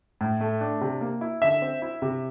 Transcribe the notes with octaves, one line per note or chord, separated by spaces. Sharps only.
A2
A3
D4
C3
A#3
E4
D3 E5
C4
E4
C3